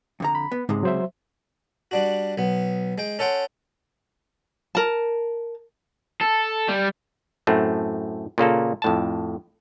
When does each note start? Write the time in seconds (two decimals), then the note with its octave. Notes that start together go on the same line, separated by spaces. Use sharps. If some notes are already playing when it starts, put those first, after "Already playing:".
0.20 F2 D3 A#5
0.35 B5
0.52 B3
0.69 C#2 G#2 C3 G#3
0.83 F#3 C5 E5
1.91 G3 D4 F#4
2.38 B1 B3
2.98 G#3 G5
3.19 C#4 A4 F#5 G5 C6
4.75 A#4 A5
6.21 A4
6.68 G3
7.47 F#2 A2 A3 C4
8.38 A#2 C#3 A#3 A4
8.82 F2 A2 A5